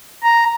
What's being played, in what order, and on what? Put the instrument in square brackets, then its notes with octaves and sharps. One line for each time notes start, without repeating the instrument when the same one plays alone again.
[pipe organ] A#5